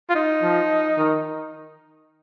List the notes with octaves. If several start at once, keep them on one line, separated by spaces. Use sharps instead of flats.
F4
D#4
F3
D#3